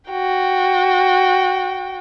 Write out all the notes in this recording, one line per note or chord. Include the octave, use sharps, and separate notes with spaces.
F#4 G5